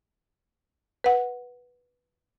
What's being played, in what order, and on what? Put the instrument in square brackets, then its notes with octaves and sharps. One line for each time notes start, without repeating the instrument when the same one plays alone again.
[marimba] B4 F#5